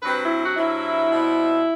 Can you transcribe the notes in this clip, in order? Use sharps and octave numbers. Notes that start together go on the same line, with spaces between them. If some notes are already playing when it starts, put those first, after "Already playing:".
G2 F#3 C4 B4
E4
F#4
G2 F#3 C4 E4
B2 G3 C4